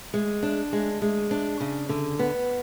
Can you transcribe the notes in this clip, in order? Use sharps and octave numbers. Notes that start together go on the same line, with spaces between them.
G#3
D4
G#3
G#3
D4
C#3
D3
B3